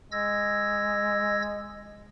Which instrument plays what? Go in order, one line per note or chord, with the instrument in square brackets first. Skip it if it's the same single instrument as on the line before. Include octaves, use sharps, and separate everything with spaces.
[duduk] G#3 [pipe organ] E6 G#6 A#6